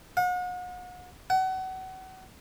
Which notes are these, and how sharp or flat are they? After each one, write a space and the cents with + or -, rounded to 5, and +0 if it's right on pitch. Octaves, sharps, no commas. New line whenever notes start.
F#5 -40
F#5 +30